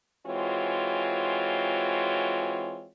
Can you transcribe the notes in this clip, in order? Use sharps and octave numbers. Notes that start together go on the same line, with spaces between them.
E3 G#3 C4 F4 F#4 C#5